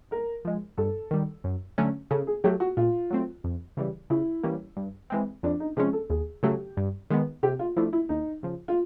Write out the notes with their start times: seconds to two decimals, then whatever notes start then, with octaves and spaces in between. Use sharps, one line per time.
0.11 G#2 A#4
0.45 F3 G#3
0.77 G2 A4
1.11 D#3 G3
1.44 F#2
1.78 D3 F#3 A3 C#4
2.10 C#3 A4
2.27 G#4
2.44 F#3 A3 G4
2.60 F#4
2.77 A#2 F4
3.10 F#3 A3 C4
3.44 F2
3.77 C#3 E3 G3
4.10 C#3 E4
4.43 E3 G3 A#3 C#4
4.77 G2
5.10 E3 G#3 C4
5.43 F2 D4
5.60 D#4
5.76 C3 F3 G#3 C#4 G#4
5.93 A4
6.09 D#2 G#4
6.43 C#3 F#3 A3 G4
6.77 G2
7.10 D#3 G#3 B3
7.43 C3 G4
7.59 F4
7.77 F3 A3 D4 E4
7.93 E4
8.09 D#2 D#4
8.43 C#3 F3
8.68 F4